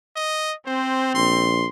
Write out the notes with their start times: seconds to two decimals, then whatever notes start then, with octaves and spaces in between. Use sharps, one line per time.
0.16 D#5
0.66 C4 C5
1.15 A#1 C6